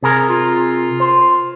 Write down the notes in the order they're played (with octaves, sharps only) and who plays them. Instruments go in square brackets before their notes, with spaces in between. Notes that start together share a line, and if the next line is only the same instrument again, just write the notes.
[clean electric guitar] C3 G#4 A#4
[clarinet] F4
[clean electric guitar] C5